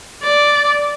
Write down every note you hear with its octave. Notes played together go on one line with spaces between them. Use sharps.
D5